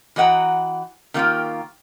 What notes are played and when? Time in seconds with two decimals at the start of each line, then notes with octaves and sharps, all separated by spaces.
0.16 E3 F#4 D#5 F#5 G5 A#5
1.14 D#3 A#3 F4 G4 G5